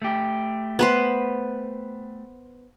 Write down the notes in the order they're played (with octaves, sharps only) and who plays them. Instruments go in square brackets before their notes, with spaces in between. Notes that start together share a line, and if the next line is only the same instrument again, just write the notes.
[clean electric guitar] A3 G4
[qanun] B3 B4 C5